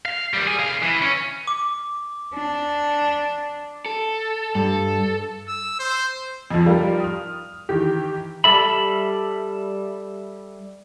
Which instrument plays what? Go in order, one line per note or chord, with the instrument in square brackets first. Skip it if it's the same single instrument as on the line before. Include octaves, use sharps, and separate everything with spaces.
[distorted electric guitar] F5
D#2 G3
G#4
C2 F5
E3
C#4
[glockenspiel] D6
[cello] D4
[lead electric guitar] A4
[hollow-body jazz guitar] G2 [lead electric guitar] A4
[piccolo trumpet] E6
C5
[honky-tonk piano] F2 F3
F3 G3 F4 A#4
D#6 F6
D#3 E3 G4
[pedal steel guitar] G3 A4 E5 B5